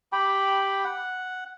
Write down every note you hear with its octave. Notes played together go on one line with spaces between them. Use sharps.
G4 G5 B5
F#5